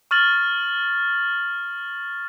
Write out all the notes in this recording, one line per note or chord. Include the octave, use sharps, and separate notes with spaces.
C#6 F6 A6 F#7